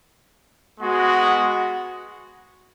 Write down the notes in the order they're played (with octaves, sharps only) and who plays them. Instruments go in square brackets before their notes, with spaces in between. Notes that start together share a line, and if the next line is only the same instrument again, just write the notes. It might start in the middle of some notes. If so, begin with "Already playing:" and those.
[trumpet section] G#3 B3 F#4